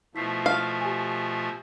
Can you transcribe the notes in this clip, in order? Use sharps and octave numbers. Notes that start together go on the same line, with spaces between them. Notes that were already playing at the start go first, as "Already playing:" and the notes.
B2 F3 A3 E4 B6 C7
F5
G4 G#5